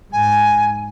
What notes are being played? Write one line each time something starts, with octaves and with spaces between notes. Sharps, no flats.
G#2 G#5